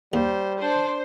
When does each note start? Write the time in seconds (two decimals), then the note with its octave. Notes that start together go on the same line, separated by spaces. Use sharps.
0.13 D#2 G3 C5
0.60 D4 A4 C5